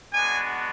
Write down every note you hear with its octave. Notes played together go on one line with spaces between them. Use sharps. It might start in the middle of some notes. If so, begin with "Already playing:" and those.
G#3 B3 D4 F#4 G#5